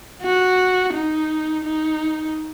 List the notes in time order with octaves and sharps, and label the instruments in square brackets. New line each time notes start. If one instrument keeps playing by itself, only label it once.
[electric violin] F#4
D#4
D#4